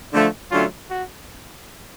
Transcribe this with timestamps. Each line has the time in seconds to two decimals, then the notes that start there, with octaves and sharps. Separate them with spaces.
0.13 D3 F3 A3
0.51 D3 F#3 A3 C#4 F4
0.90 F#4